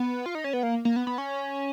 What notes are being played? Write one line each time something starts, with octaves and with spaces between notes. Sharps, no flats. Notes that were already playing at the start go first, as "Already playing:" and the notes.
Already playing: B3
F4
D#4
C#4
B3
A#3
A#3
B3
B3
C#4